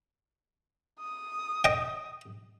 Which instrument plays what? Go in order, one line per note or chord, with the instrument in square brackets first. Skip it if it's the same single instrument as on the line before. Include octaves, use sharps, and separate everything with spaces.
[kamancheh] D#6
[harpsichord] D#5 G5